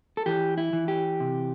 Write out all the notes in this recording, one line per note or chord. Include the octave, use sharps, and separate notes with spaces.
A4
E3 G4
E4
E3
G4
C3